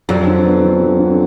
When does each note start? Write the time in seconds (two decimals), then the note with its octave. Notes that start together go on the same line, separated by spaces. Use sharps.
0.09 F2 F#3
0.27 D3
0.45 B3
0.64 D3
0.82 F#3
0.99 D3